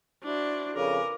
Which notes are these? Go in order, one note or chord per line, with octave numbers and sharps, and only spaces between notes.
D4 E4 F#4 C5
F2 C#3 A#4 B4 G#5 D6